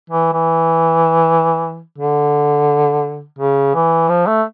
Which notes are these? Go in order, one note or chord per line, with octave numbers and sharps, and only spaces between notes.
E3
E3
D3
C#3
E3
F3
A3